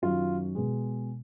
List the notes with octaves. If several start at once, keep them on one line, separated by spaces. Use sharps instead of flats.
F#2 D#3 F#3 F4
B2 G#3